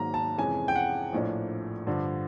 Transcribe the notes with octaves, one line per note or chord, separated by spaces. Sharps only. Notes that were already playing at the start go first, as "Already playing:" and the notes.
Already playing: G#2 D#3 F#3 A#3 A#5
A5
F2 C3 E3 G#3 C#4 G#5
G5
F#5
A#1 A2 F3 A#3 D4
G2 D3 F3